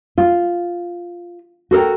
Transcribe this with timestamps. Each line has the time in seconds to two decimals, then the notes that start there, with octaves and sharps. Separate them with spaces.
0.18 F4
1.71 F#4 A4 A#4 G5